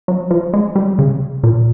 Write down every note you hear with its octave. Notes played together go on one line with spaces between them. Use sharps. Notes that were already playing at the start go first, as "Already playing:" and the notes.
F#3
F3
G#3
G3
C#3
A#2